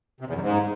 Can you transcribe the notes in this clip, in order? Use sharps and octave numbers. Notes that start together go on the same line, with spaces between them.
C3
E2
F#2
G#2